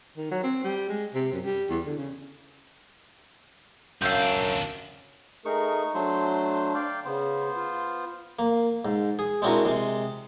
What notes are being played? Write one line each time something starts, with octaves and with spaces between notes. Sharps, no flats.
D#3
F#3
C4
G3
G#3
C3
F#2
G3
E2
D3
C#3
C#2 F#2 D4 F5 E6 G6
A3 D#4 G#4 A#4 C#6
F#3 A3 D4 C5
D5 F5 G5
C#3 B3 C5
F4
A#3
G#2
G#4
G#3 C4 D4 E4 F#4 A#4
C3 G#3